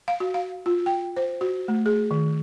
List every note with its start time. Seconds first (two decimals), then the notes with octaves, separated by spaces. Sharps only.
0.08 F5
0.20 F#4
0.34 F5
0.66 F4
0.86 G5
1.17 C5
1.41 F#4
1.68 A3
1.86 G#4
2.11 D#3